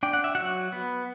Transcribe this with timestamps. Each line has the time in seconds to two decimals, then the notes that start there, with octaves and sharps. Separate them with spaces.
0.03 D4 G5
0.13 F#5
0.24 E5
0.35 F#3 F#4 F#5
0.72 B3